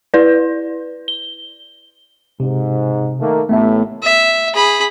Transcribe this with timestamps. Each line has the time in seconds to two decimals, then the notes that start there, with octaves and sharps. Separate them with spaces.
0.14 E4 B4 D5
1.08 G7
2.40 G#2 C3
3.20 D#3 A3 A#3
3.49 A1 A2 A3 B3 E5
4.03 E5
4.54 G#4 B5